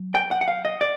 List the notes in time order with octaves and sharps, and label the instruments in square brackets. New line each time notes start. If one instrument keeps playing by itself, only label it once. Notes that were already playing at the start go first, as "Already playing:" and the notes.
Already playing: [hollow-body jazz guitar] F#3
G5
F#5
F#5
F5
D#5
D5